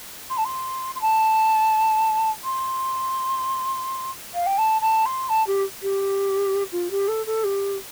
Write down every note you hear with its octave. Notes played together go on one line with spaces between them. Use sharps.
C6
A5
C6
C6
A5
C6
F5
G5
A5
A5
C6
A5
G4
G4
F4
G4
A4
A4
G4